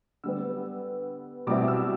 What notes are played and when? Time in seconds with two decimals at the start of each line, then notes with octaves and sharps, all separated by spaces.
0.24 D3 G3 B3 E6
1.47 B2 G3 C4 E4 D6
1.68 E6